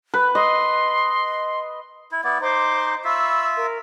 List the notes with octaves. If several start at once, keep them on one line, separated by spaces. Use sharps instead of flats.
B4
D#5 C6
E4
B3 E4 D5
D#4 C5 C6 D6
F4 E5 B5 C#6 E6
A#4